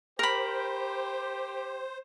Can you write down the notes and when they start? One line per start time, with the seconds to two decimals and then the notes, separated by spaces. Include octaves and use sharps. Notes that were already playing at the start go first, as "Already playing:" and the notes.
0.19 G4 A#4 C5 B5